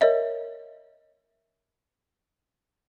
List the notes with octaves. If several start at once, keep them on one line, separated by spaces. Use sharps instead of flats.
A#4 C#5 D#5 E5